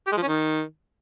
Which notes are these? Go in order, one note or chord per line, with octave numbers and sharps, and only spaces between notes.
G4
G#3
F3
C#4
D#3